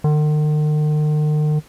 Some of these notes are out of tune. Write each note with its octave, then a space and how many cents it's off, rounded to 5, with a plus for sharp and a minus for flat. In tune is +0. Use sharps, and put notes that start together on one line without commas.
D#3 -45